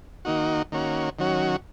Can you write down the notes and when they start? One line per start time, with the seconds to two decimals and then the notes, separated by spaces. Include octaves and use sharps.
0.25 D#3 A#3 D#4 F#4
0.72 D#3 A#3 C#4 F#4
1.19 D#3 F#3 C#4 F#4